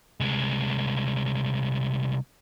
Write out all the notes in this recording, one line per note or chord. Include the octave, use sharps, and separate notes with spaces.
C2 G#3